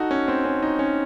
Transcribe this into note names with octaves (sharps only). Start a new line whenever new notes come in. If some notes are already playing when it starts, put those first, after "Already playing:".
Already playing: D#4 F#4 A4
C#4
C4
C#4
D#4
C#4